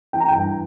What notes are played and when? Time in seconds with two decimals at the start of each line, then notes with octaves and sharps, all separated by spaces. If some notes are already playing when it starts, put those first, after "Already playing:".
0.13 E3 G5
0.20 A#5
0.28 G5
0.35 G2